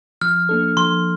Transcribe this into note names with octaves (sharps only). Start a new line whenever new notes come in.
F3 F6
A#3 D4 A4
F3 C6